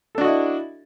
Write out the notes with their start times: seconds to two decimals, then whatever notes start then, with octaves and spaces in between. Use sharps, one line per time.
0.15 A4
0.18 D4
0.21 F#4
0.24 D#5
0.27 E4